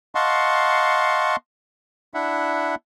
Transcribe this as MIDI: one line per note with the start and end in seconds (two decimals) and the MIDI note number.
0.15 1.36 75
0.15 1.36 77
0.15 1.36 78
0.15 1.36 81
0.15 1.36 84
0.15 1.36 85
2.14 2.75 62
2.14 2.75 64
2.14 2.75 76
2.14 2.75 78